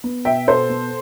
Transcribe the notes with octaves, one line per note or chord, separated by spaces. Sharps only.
B3
B2 E5 G5
B2 A4 C5
B3